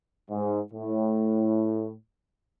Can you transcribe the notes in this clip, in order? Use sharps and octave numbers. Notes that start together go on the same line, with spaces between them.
G#2
A2